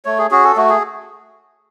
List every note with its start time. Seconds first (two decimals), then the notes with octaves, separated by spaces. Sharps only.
0.05 A3 C#5
0.19 G#4
0.31 C#4 F#4 G#4
0.44 A4
0.56 A3 F#4
0.69 G#4